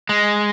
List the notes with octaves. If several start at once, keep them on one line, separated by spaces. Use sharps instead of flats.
G#3